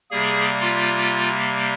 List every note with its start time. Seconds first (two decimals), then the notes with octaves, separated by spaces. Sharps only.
0.11 C3 G3 A#3 G#4
0.61 F4